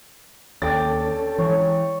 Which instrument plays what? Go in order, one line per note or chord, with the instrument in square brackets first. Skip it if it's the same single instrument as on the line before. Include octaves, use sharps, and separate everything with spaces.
[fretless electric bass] D#2 [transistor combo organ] C#4 A4 [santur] D5 [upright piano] G5 A6
[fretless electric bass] E3 G#3 [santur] C#5